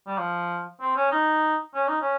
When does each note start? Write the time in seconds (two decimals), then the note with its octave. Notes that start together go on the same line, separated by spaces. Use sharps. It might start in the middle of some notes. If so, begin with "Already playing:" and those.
0.07 G3
0.18 F3
0.81 C4
0.96 C#4
1.12 D#4
1.75 C#4
1.88 D#4
2.01 C#4